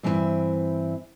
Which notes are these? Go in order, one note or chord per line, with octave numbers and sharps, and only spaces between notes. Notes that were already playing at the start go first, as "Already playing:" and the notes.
G2 E3 C4 A4 B4 E5